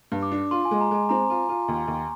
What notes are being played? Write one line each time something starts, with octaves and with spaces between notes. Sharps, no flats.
G2
D6
D4
F4 C6
G#5
G#3
A#5
G#3 G#5
C4 A#5
F4
F4
D#2
D#2